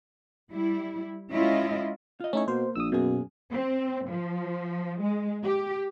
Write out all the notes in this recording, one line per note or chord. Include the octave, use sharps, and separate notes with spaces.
G3 E4
G#3 C#4 E4 F4 D#5 E5
F4 D#5
A3 C#4 D#4 E4 C#5
B2 A#3 C5
A#1 D#6 E6
F#2 B2 A#3 G#4
C4
F3
G#3
G4